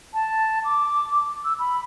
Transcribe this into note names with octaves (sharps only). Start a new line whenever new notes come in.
A5
D6
E6
B5